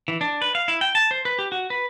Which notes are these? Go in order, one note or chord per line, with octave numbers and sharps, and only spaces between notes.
E3
D4
B4
F5
E4
G5
A5
C5
B4
G4
F#4
B4